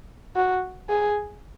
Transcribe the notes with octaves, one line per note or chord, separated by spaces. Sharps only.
F#4
G#4